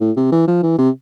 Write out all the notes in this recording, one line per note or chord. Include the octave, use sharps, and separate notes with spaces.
A2
C3
E3
F3
E3
C3